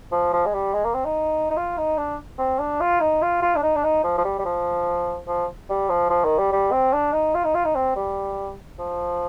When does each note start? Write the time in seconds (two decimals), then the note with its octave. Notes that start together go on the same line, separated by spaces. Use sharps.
0.12 F3
0.33 F3
0.46 G#3
0.54 G3
0.74 G#3
0.85 A#3
0.94 C4
1.05 D#4
1.50 D#4
1.57 F4
1.77 D#4
1.98 D4
2.38 C4
2.59 D4
2.80 F4
3.00 D#4
3.22 F4
3.42 F4
3.55 D4
3.62 D#4
3.76 D4
3.83 D#4
4.03 F3
4.18 F3
4.25 G3
4.39 G3
4.45 F3
5.27 F3
5.69 G3
5.89 F3
6.10 F3
6.25 D#3
6.38 G3
6.52 G3
6.72 C4
6.93 D4
7.13 D#4
7.35 F4
7.44 D#4
7.55 F4
7.65 D#4
7.75 C4
7.96 G3
8.79 F3